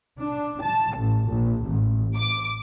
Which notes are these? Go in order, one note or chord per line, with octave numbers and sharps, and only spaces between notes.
D4
A5
A1
A#1
A1
D6